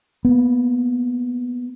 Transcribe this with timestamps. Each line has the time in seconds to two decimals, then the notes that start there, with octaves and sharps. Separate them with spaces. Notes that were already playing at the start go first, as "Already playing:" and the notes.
0.25 A#3 B3